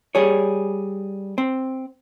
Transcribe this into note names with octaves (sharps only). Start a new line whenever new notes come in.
G3 G#4 C#5
C4